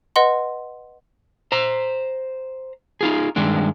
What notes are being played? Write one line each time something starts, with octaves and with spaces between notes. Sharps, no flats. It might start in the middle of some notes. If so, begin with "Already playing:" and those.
B4 D#5 F#5 C6
C5 A#5
D#4 F4 G#4
G2 D#3 G#3 D4